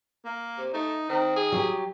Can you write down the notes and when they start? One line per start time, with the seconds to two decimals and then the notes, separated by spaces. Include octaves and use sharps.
0.25 A#3
0.58 C3
0.74 A3 D#4
1.09 D#3 C4
1.36 G#4
1.52 F#3 G4